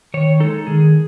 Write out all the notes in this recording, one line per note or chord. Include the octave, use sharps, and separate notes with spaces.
D#3 C#5
G#3 D#4 A4
D#3 G#4